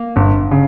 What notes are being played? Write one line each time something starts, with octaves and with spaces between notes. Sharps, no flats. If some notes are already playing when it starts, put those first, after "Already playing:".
Already playing: A#3
G1
C#3